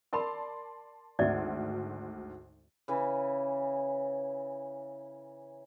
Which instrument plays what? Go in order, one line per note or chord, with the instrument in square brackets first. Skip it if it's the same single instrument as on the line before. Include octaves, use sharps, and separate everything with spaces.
[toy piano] A#4 B5 [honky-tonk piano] D5 A5 C6
[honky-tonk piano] G#1 D2 [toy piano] D5 E5
[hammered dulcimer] C#3 E3